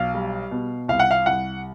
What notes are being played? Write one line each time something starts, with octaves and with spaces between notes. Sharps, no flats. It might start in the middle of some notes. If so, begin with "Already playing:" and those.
Already playing: B1 F5
G3
B2
C2 F5
F#5
F5
C2 F#5